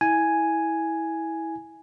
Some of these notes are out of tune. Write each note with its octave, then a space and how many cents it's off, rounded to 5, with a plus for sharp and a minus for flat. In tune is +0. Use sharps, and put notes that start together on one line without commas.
E4 -15 G#5 +0